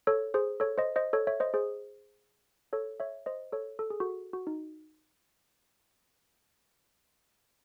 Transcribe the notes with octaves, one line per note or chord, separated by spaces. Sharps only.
A4 C#5
G#4 C5
A4 C#5
C5 D#5
C5 D#5
A4 C#5
C#5 E5
C5 D#5
G#4 C5
A4 C#5
C#5 E5
C5 D#5
A4 C#5
A4
G#4
F#4 A4
F#4
D#4